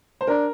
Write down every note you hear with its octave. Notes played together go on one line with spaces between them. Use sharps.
C5
D4 A#4